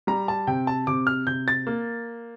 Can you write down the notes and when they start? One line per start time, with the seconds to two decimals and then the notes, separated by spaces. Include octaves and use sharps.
0.07 G3 A#5
0.28 A5
0.47 C3 G5
0.67 A5
0.87 C3 D6
1.07 F6
1.27 C3 G6
1.48 A6
1.67 A#3